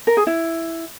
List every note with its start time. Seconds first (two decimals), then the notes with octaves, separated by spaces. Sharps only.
0.07 A#4
0.17 G#4
0.27 E4